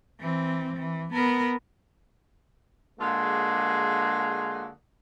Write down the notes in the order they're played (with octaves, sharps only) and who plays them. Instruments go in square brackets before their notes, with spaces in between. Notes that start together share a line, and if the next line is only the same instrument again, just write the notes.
[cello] E3 C4
E3
B3 A#4
[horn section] D3 G#3 A#3 F4 F#4 G#4